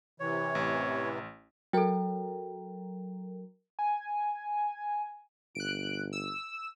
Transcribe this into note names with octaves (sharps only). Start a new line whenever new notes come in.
C3 E3 C#5
A1
F#3 A4 A#4 G5
G#5
G1 F#6 D7
E6